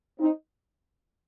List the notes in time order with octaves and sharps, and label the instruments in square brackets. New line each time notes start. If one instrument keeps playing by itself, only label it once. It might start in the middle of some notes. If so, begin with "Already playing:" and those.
[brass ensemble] C4 D#4